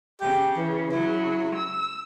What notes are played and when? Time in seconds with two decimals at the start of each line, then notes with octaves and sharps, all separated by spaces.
0.21 C#3 G4
0.57 E3
0.91 C#3 F#3 E4
1.54 E6